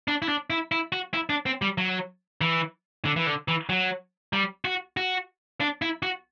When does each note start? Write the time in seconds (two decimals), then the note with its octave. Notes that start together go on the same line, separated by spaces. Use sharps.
0.08 D4
0.22 E4
0.28 D4
0.50 E4
0.72 E4
0.92 F#4
1.14 E4
1.29 D4
1.46 C4
1.62 G3
1.78 F#3
2.41 E3
3.05 D3
3.16 E3
3.27 D3
3.48 E3
3.69 F#3
4.33 G3
4.65 F#4
4.97 F#4
5.60 D4
5.82 E4
6.03 F#4